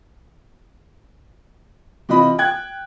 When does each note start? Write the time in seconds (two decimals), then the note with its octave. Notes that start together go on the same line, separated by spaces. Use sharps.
2.09 C3 E3 F4 D#5 B5
2.39 G5 F#6 G#6